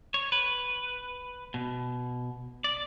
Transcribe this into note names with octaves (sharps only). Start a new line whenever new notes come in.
C#5
B4
B2
D5